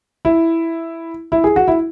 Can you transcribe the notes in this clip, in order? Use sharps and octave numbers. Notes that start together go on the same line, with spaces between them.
E4
E4
G#4
F#4
E4